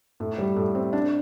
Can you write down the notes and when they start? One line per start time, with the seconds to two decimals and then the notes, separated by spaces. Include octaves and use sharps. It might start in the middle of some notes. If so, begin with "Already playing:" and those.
0.20 A2
0.38 G3
0.56 A2
0.75 C4
0.93 D4